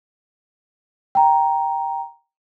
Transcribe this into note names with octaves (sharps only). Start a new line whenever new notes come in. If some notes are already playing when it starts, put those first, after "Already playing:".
G5 A#5